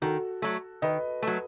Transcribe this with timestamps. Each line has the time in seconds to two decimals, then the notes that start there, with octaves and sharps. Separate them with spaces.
0.02 D#3 F#4 A4
0.42 F#3 A3
0.82 D#3 B4 D#5
1.23 F#3 A3